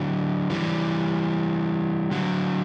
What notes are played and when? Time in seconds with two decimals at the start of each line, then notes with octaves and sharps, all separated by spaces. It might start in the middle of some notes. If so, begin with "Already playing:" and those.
Already playing: D3 F#3
0.50 E3 G3
2.12 D3 F#3